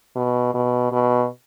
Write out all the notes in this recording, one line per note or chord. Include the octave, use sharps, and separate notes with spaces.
B2
B2
B2